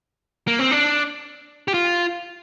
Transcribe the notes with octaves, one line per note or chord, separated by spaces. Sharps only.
A#3
C4
D4
G4
F4